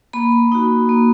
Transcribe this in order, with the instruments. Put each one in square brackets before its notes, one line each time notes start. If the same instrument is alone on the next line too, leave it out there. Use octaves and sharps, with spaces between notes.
[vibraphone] A#3 B5
D#4 F#4
A#3